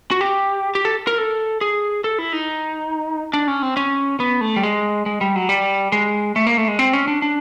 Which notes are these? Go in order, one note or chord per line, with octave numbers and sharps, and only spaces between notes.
F#4
G4
G4
A4
A#4
A4
G#4
A4
E4
D#4
D4
C#4
C4
C#4
B3
A3
G3
G#3
G#3
G3
F#3
G3
G#3
A3
A#3
A3
G#3
C4
C#4
D4
D4